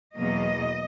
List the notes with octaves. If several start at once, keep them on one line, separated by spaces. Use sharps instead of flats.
E2 B2 F#3 A#3 D#5